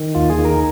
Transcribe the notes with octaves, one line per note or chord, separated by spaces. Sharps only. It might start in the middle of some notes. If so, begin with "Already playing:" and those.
Already playing: D#3
D#2 F4
G#4
D#3
A#4